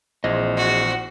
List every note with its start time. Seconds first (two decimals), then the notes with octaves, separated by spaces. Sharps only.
0.24 A#1 E3 C4 G#4 C5 D#5
0.57 F#4